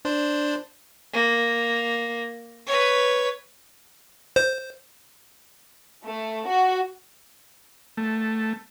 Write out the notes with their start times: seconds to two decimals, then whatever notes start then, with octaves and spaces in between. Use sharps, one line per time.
0.05 D4 C5
1.13 A#3
2.66 B4 C#5
4.36 C5
6.05 A3
6.47 F#4
7.97 A3